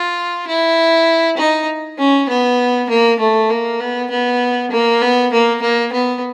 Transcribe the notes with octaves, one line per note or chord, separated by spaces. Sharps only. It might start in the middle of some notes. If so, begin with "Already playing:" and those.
Already playing: F4
E4
D#4
C#4
B3
A#3
A3
A#3
B3
B3
A#3
B3
A#3
A#3
B3